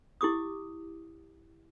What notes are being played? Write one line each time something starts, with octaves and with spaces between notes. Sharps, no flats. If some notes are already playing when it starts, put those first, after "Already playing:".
E4 G4 D6 D#6